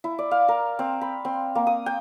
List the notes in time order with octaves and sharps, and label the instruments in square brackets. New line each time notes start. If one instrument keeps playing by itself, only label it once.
[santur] E4
D5
F5
A#4
C4
B5
C4
A#3
D#6
G5